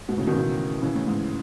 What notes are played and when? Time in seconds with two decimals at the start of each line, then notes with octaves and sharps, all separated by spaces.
0.08 G#2 B2
0.18 A2 C#3
0.27 B2 D#3
0.36 C#3 E3
0.82 C#3 E3
0.95 A2
1.07 G#2